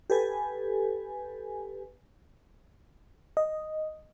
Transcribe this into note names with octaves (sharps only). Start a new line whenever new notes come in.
G4 A4 B4 G#5
D#5